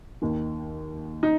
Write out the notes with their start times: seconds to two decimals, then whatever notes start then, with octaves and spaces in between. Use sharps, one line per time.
0.22 D#2 D#3
1.23 D#4